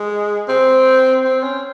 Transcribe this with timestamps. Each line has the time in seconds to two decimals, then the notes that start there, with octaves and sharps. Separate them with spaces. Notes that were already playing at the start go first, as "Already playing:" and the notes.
Already playing: G#3
0.49 C4
1.24 C4
1.43 C#4